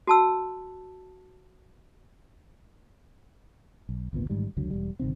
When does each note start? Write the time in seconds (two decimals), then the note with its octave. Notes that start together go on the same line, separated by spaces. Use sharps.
0.07 F#4 A5 E6
3.89 B1
4.13 G#1 D2 A#2 B3
4.30 A1 G#2 D#3 G3
4.57 F1 C#2 D3 F#3
4.71 E1 G3
4.99 G1 C3 D#3 C4